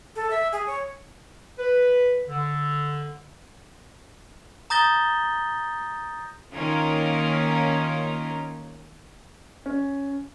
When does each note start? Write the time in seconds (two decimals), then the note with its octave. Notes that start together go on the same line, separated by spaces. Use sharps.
0.16 A4
0.30 E5
0.52 G#4
0.67 C#5
1.59 B4
2.28 D3
4.70 A#5 D#6 G6 A6 A#6 G7
6.53 D#3 A#3 C#4 F4 A#4
9.66 C#4